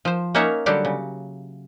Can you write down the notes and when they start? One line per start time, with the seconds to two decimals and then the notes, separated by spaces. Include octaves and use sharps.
0.05 F3 C5
0.35 A#3 C#4 D#4 C#5 E5 F#5
0.66 D3 F#3 G3 F#4 G4
0.85 C#3